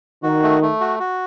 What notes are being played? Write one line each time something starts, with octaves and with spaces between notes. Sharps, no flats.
D#3 F#4
A3
A3
F#4
F#4